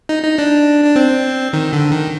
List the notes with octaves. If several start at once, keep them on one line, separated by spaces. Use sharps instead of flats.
D#4
D#4
D4
D4
C4
D#3
D3
D#3